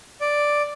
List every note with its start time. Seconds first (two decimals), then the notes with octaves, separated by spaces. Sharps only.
0.21 D5